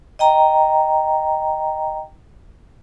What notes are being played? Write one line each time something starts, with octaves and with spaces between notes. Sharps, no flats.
D#5 G5 A#5